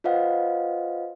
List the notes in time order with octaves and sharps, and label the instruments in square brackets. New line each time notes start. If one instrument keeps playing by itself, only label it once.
[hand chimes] F4 B4 C5 D#5 F5 F#5